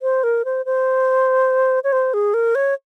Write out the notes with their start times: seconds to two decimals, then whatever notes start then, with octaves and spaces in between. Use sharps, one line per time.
0.02 C5
0.24 A#4
0.45 C5
0.66 C5
1.84 C#5
1.92 C5
2.14 G#4
2.34 A#4
2.55 C#5